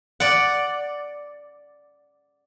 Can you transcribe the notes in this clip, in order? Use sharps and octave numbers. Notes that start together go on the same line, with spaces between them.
D5 F#5